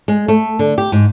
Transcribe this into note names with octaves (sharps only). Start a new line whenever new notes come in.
G#3
A3
D3
G4
G#2